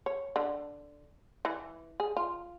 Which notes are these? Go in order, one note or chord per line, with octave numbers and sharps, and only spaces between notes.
C#5
D3
E3
G#4
F4